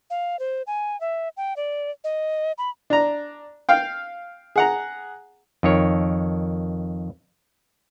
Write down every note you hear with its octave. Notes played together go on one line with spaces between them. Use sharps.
F5
C5
G#5
E5
G5
D5
D#5
B5
D4 A#5
F5 G5
G#4 F#5 A#5
F2 D#3 C#5